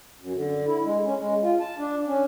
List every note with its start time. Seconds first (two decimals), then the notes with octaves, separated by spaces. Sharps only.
0.21 F#2
0.35 D3
0.67 E4
0.84 G#3
1.05 C#4
1.20 G#3
1.42 F4
1.60 A5
1.78 D4
2.07 C#4